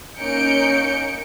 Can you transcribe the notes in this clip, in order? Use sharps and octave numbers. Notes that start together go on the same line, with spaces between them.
A#3 C#4 D#4 G6 C#7 D7